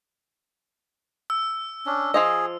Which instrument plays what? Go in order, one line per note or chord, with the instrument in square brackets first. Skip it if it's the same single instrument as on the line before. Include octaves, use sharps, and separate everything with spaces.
[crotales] E6
[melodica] C#4 D4
[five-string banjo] F3 F4 D#5 [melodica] G#4